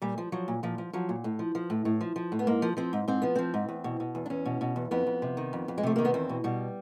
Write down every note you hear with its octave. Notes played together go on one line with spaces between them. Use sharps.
A#2 G3
F3
F3 F#3
A#2
A#2 F3
F3
F3 F#3
A#2
A2
F3
F3
A2
A2
F3
F3
A2
B3
G#2 A#3
F3
F3 C4
G#2
G#2 C4
F3 B3
F3 C4
G#2
E2
B2
B2
E2
D4
E2 C#4
B2
B2
E2
F2 B3
F2
C3
D#3
F2
F2
G#3
C3 A3
D#3 A#3
B3
E2 C4
B2
B2 G3